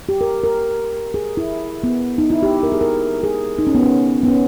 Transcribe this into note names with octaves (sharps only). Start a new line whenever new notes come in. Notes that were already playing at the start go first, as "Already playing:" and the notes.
G4
A#4
A#4
G#4
E4
B3
D#4
E4
G4
A#4
G#4
A#4
G#4
D#4
C#4
B3
C#4
B3
C#4